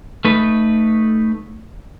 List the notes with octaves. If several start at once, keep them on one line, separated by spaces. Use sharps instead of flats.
A3 D#4 B4